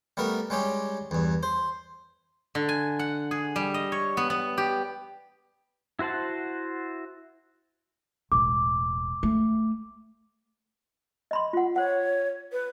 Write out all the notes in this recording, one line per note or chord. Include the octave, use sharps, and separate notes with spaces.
G3 A3 B3 A#4
G3 G#3 C#4 G4
E2 G2
C5
D3
G#5
F#5
G#4
G3
D#5
C#5
B3
B3
G4
E4 F#4 C5 F#5 A5
E1 A1 D6
A3
D#5 B5 C6
F4 F#5
C5 C#5 F#5
B4